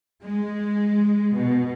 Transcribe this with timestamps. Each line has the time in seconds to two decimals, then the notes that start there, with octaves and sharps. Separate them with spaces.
0.23 G#3
1.37 B2